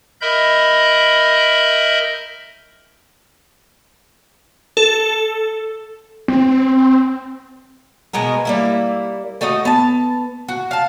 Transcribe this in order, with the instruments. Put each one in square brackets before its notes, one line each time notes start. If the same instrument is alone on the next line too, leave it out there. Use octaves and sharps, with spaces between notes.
[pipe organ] A#4 D#5 E5 B5 G6
[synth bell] A4
[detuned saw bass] C4
[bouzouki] B2 G#3 B3 A#4
G3 A#3 E4
A3 D#4 F#4 D#5
B3 A5
F#4
F5 A5